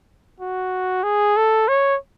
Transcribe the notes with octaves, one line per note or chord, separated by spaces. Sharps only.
F#4
G#4
A4
C#5